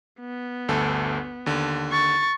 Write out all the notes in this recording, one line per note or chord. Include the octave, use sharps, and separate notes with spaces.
B3
G1 D2 A4
D#2 D3
C#6 A6